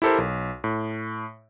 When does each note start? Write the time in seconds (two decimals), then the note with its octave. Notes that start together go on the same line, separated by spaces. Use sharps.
0.02 E4 G4 A4 A#4 C5
0.18 B1
0.64 A2